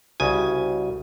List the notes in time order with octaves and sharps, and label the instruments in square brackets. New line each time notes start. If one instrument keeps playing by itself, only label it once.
[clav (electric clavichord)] C2 C#3 G#5 [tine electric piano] F#4